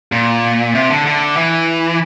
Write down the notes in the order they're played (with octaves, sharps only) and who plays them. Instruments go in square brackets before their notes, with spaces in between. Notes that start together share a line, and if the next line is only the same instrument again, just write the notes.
[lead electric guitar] A#2
C3
D3
D3
E3